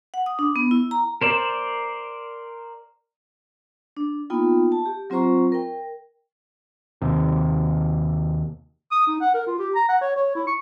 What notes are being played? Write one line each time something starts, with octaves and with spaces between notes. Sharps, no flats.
F#5
D#6
D4
B3
E4
A#5
A#4 C5 D5
D4
A#3 B3 D#4 F4 G5
A5
G4
F#3 C4 F4 C5 A#5 C#6
A#4 G5
D#2 C3
D#6
D#4
F#5
A#4
F4
G4
A#5
F#5
C#5
C#5
E4
C#6